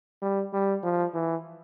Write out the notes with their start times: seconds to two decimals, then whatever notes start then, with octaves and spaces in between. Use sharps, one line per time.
0.22 G3
0.53 G3
0.84 F3
1.14 E3